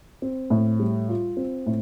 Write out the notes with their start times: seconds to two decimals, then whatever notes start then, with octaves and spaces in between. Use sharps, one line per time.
0.22 C4
0.50 A2
0.79 G3
1.09 F4
1.37 C4
1.66 A2